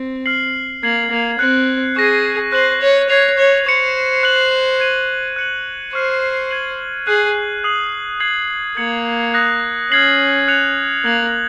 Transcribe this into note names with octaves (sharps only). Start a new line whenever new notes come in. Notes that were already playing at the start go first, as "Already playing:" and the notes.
Already playing: C4
F6 C7 F#7
A#3 G#6 C7 F#7
A#3
C4 F#6 C#7 F#7
G#4 C#6 F#6 A#6 D#7
C5 F#6 C7 D#7 F#7
C#5
C#5 G#6 C7 F7
C#5
C5 C#6 G#6 C#7
C#6 F#6 C#7 F#7
G#6 D#7 F#7
F#6 C#7 F#7
C5 C#6 F6 C7
G#6 D#7 F#7
G#4 F#6 C7 D#7 F#7
D#6 F#6 C7 F#7
D#6 G#6 C7 F#7
A#3 G#6 C#7 F#7
D#6 F#6 A#6
C#4 F6 G#6 C7 F#7
F#6 C#7 F7
A#3 G#6 C7 F#7